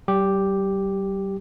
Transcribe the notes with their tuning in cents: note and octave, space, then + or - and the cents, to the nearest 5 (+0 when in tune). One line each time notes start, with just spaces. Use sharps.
G3 -35 G4 +0